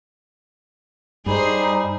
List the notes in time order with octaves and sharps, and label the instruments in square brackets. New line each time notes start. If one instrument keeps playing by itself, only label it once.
[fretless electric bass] G2 [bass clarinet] G3 [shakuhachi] D#4 [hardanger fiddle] G#4 C5